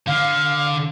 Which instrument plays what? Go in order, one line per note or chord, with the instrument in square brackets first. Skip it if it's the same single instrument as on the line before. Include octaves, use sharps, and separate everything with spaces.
[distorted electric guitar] D3 [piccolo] F5